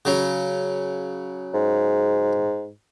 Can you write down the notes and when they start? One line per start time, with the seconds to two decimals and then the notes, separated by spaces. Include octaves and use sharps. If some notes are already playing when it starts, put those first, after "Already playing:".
0.05 C#3 F#3
1.54 G#2